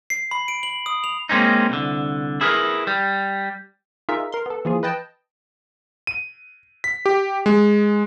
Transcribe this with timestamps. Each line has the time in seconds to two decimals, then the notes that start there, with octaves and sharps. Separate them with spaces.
0.10 C7
0.31 B5
0.48 D7
0.63 F#7
0.86 D#6
1.04 F7
1.29 G#3 A#3 C4 C#4 D#4
1.70 C2 D3
2.41 E4 G#4 A#4 B4
2.87 G3
4.09 D#4 F4 G#4 A#4 E5
4.32 A#4 C6
4.46 B3 A4
4.65 E3 F3 A#3 F4 G#4
4.83 B4 D#5 G5 A5
6.07 D#7
6.84 B6
7.06 G4
7.46 G#3